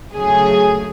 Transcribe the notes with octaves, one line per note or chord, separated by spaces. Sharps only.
C#3 F#3 A3 G#4